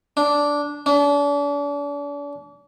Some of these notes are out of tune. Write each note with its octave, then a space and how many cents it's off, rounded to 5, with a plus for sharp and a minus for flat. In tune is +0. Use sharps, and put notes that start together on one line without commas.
D4 -10
D4 -40